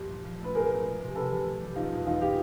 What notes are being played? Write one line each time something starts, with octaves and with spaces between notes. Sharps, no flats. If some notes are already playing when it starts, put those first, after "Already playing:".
Already playing: A#1 G2 G3
A#2
F3
A3 B4
B1 G#4 A#4
A#2
G#3
C3
C3 A4 B4
E3
B2
G3
F#1 D#4 F4
E2
E3 D#4 F4
G#3 F4 G4